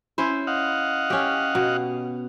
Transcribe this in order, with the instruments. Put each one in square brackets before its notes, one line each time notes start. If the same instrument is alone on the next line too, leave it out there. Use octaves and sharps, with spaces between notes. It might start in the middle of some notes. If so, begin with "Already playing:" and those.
[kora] C#4 E4 C5
[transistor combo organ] D#5 F5 F#5
[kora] C#4 G4
B2